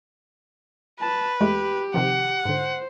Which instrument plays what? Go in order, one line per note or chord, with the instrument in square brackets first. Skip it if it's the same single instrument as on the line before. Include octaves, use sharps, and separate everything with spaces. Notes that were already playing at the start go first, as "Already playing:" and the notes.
[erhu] B4 [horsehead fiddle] A5
[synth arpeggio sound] E2 G#3 A3 [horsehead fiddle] G4
[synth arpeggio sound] C3 D#3 F3 [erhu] F#5
[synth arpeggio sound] G#2 D3 [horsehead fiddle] C5